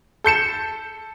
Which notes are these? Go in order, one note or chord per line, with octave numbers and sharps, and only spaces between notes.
A4 G6 C#7 E7